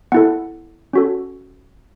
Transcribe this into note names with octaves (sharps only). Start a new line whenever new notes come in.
B3 E4 A4 F#5
C#4 F#4 A4